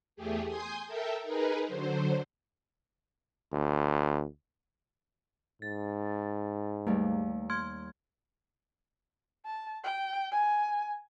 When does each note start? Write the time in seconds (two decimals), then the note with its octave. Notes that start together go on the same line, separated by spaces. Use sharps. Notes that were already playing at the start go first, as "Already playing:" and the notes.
0.16 E2 A3 G4 G#4
0.46 G#5 C6 D#6 G6
0.86 A4 A#4 E5 G5
1.23 D#4 G#4 A#4 B4
1.65 D3 F#3 C5
3.52 D2
5.62 G#2 A6
6.87 D#2 G3 A3
7.50 C6 F6 G#6
9.45 A5
9.84 G5
10.31 G#5